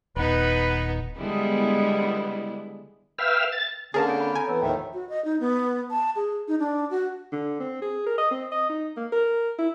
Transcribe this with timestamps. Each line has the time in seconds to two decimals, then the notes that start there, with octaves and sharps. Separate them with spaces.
0.16 D#1 B3 D#4 B4
1.18 D3 G3 G#3 B3 E4
3.18 B4 E5 F5 G5 E6 F6
3.52 A6
3.94 D3 A#3 C#4 G#4 A#4 A5 A6
4.07 C4 G6 D7
4.20 B5
4.35 A4 G#5 A#5
4.48 E3 B3 C#5 E6
4.62 D#2 A2 D#3 F3 A3 E5 G5
4.93 F#4
5.09 D#5
5.24 D#4
5.40 B3
5.90 A5
6.16 G#4
6.48 D#4
6.59 D4
6.90 F#4
7.32 D3
7.60 C4
7.82 G#4
8.06 A#4
8.18 D#5
8.31 C4
8.52 D#5
8.70 D#4
8.97 A#3
9.12 A#4
9.59 E4